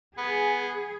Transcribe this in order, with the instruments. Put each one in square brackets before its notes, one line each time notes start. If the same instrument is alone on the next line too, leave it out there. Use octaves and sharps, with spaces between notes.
[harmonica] B3 [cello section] G#4